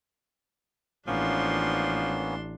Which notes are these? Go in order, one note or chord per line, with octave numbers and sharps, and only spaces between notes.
A1 F3 A#3 B3 C#4 D4 C6